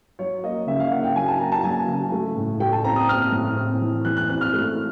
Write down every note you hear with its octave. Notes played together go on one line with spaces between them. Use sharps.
F#3 C#5
A#3 D#5
C#3 E5
F5
A#3 F#5
G5
F#3 G#5
A5
A#3 A#5
A5
F#3 G#5
C#3
A3
A2
A3 G5
A5
C4 A#5
D#6
C4 F6
A2
C4
E3
E3 F#6
F#6
C4 F#6
F6
A3